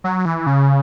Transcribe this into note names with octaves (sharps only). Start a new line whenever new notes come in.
F#3
E3
C#3